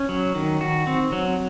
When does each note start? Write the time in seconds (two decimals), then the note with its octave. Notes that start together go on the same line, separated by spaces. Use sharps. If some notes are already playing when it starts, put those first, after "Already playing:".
Already playing: C#4
0.09 F#3
0.35 D#3
0.61 F#4
0.87 C4
1.12 F#3